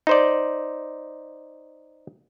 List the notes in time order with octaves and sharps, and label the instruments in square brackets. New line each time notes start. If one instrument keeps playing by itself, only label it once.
[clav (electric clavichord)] D#4 C5 D5